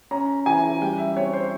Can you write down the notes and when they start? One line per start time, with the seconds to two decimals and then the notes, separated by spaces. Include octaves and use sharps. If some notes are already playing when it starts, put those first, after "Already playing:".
0.11 C#4 A#5
0.46 E3 G#5
0.82 G3 G5
0.98 E5
1.16 C4 C#5
1.33 C5